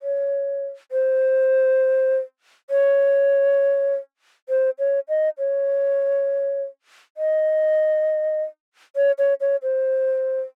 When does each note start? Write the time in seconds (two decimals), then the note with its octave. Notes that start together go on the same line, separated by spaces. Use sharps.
0.03 C#5
0.92 C5
2.70 C#5
4.49 C5
4.79 C#5
5.09 D#5
5.38 C#5
7.17 D#5
8.96 C#5
9.18 C#5
9.41 C#5
9.63 C5